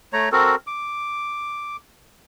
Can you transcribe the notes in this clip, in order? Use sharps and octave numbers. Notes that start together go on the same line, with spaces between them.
A3 C#5 A#5
C4 F#4 A4 A#4
D6